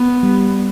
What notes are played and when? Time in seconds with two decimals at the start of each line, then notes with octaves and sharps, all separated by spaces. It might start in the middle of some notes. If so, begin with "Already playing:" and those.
Already playing: B3
0.23 G3